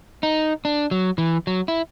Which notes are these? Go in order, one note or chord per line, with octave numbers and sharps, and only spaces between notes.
D#4
D4
F#3
E3
F#3
E4